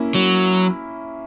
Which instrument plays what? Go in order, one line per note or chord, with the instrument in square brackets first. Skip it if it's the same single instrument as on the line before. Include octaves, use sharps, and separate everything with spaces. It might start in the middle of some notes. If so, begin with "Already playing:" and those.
Already playing: [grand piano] A#3 C#4 E4
[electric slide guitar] F#3